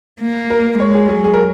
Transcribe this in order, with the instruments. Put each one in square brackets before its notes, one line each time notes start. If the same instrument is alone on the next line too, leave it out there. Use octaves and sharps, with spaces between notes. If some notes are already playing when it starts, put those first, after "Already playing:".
[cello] A#3
[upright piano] A#4
[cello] G#3 [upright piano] C#5
[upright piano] G#4
[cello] F#3 [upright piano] G#4
[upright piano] G#4
A#4